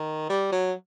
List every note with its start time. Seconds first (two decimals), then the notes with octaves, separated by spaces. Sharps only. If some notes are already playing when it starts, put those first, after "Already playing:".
Already playing: D#3
0.29 G3
0.52 F#3